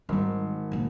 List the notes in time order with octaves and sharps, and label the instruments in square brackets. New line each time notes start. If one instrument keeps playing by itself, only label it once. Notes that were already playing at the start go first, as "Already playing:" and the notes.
[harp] G#1 [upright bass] G3 C4
[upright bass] C2 A#2